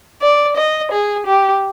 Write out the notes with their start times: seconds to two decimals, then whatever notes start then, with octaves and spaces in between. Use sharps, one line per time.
0.22 D5
0.57 D#5
0.92 G#4
1.27 G4